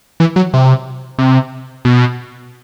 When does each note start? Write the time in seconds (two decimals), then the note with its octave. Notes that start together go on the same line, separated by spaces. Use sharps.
0.20 E3
0.36 F#3
0.54 C3
1.19 C3
1.85 B2